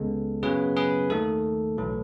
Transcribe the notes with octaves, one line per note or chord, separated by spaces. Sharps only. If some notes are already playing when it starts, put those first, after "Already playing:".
Already playing: C#2 C#3 G#3 B3 A4
F#2 C#3 F#3 B3 G#4 B4
G#4 B4
D#2 D#3 A3 A4
B1 A2 E3